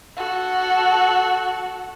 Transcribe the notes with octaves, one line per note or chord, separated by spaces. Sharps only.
F#4 A4